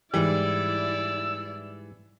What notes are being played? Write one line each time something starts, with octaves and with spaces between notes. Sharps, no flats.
G#2 E3 G3 E4 D5 E6